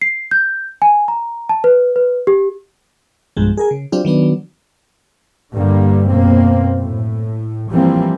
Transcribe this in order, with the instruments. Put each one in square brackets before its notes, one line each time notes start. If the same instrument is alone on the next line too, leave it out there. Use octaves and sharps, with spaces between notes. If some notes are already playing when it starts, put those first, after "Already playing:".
[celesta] C7
G6
G#5
A#5
A5
B4
B4
G4
[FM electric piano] B1 G2 F3 G#3
G#4 A#4 G#5
C#3
F#3 C4 D4 F4 G4
D#3 F#3 B3 D4
[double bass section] G2 D3 G3 A#3
F#2 B2 A#3 C4
A2
E3 F3 G3 A#3 C4